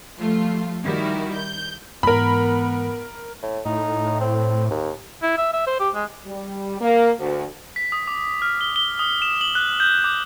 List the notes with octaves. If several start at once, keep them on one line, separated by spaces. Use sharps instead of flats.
F3 G3 A3 F4
D#3 G3 E4 F#4
G6
G#2 E3 B3 A#4 B5
A2
A2 D#4
C4
D#2
E4
E5
E5
C5
G4
G#3
G3
A#3
D2
B6
D#6
D6
F6
G7
G7
D#6
E7
F#7
F#6
G6
D6